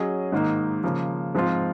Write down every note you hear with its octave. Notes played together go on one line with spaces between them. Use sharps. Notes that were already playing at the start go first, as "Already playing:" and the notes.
Already playing: F#3 C#4 G#4 D#5
G#2 D#3 A#3 D#4
C#3 F3 A#3
G#2 F3 C4 F4